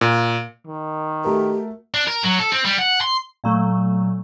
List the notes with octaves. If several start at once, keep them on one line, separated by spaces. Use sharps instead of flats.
A#2
D#3
A3 F#4 G4 A#4
D4
A#4
F#3
A4
C4
G3
F#5
C6
A#2 F#3 A3